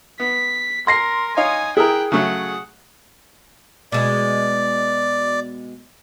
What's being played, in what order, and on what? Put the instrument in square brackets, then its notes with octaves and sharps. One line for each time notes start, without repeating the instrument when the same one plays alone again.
[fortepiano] B3 [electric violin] B6
[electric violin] A#4 [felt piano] C6 A#6 C7
[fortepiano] D#4 C#5 F5 [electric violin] G#5 D#6
[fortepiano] E4 A#4 [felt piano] G#4 [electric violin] G5 F#6
[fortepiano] C#3 F#3 A3 [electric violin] F#5
[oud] B2 G#3 [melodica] D5